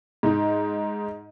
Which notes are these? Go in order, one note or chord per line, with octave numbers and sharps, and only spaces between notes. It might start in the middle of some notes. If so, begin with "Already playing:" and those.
G#2 D#4